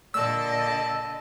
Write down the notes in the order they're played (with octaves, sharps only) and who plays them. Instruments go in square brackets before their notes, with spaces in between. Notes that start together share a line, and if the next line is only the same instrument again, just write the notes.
[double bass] A#2 [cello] D3 D#5 [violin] D5 A5 [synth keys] E6